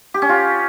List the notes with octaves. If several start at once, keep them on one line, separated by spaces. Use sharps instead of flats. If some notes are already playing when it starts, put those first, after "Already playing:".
G4
C#4
F4